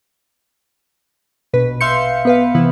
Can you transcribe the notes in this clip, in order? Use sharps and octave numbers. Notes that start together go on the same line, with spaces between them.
A#1 B2 B4
E5 F5 C6 G6 C#7
B3 B4 F5
C3 E3 B3 E4